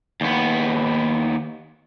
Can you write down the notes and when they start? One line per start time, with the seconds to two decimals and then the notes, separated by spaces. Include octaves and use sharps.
0.21 D#2 B3